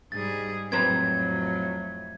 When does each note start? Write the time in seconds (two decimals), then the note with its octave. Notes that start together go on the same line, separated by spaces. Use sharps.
0.12 G#2 G3 G#4 A6
0.72 F2 A2 F#3 C4 B4 A#5 G#6